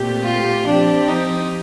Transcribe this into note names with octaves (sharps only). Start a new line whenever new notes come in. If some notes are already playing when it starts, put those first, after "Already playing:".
Already playing: A#2 A3 C4 G4
F4
F3 C4 D4 G4
D#4